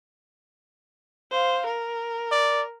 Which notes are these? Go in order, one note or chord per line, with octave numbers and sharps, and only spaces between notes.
C5 F5
A#4
D5